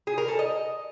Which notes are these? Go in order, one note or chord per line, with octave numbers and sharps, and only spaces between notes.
G#4
A#4
A4
D#5